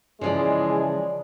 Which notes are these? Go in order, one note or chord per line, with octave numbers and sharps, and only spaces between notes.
C#3 E3 F3 G#3 D5